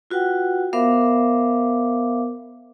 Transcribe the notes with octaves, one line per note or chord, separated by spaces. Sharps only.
F4 F#4 B4 F#5 G5
B3 A#4 C5 E5 F5 D6